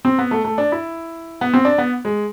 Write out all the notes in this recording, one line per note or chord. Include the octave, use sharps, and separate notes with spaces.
C4
B3
A3
A3
D4
E4
B3
C4
D4
B3
G#3